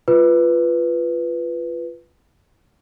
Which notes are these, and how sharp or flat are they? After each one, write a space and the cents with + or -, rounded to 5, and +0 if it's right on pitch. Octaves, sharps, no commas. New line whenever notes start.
F4 -10 B4 +0